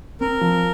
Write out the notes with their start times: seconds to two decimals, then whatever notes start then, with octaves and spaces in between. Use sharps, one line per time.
0.21 C4 A#4
0.41 F3